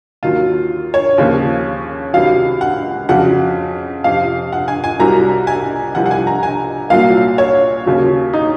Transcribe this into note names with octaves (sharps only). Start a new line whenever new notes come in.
D#2 D#3 F#3 F4
C#5
D#2 C#3 F3
C#2 C3 D#3 F#3 F5
F#5
F2 C#3 F#3 F#5
F2 C3 F3 F5
F#5
G#5
G#5
C2 C3 F#3 A#5
G#5
C2 C3 F3 F#5
F#5
G#5
A#5
G#5
C2 A#2 F#3 F5
C#5
D#2 C#3 F#3
D#4